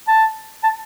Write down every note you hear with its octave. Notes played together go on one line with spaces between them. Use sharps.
A5
A5